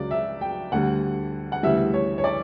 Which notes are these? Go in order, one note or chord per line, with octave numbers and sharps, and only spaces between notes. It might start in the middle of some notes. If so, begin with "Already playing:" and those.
Already playing: C#2 C#3 F#3 D5
E5
G5
D2 D3 G3 F#5
F#5
D2 C#3 E3 G3 E5
C#5
C#5
D5